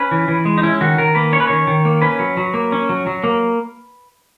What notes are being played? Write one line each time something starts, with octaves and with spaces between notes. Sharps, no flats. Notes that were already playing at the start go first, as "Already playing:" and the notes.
Already playing: C#4 B4
E3
E3
G#3
D#4
C#4 E4
D#3 F#4
D#3 A#4
A#3 B4
C#4 C#5
B4
D#3 C#5
D#3
A#3
C#4 B4
F#3
F#3
A#3
C#4
F#3
F#3
A#3